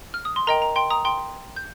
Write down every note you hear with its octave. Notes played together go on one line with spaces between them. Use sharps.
F6
D#6
C6
A#4 D#5 G5 A#5
A#5
G5 C6
A#5 D#6
G5 C6
G6